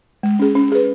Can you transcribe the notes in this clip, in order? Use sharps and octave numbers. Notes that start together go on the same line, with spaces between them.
G#3
C#4 G#4
C#4
G#4 B4